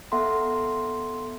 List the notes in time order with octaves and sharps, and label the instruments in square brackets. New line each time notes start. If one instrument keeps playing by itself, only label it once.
[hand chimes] B3 A4 E5 F#5 A#5 C6